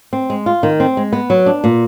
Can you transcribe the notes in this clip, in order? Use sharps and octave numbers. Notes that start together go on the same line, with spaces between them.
C4
G#3
F4
D#3
C4
G#3
B3
F#3
D4
A#2